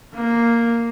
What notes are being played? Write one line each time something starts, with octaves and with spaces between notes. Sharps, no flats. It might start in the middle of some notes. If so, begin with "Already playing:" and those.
A#3